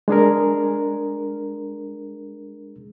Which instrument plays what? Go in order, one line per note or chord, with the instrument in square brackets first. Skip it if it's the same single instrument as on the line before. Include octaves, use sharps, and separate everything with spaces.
[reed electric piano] G#3 D4 G#4 A#4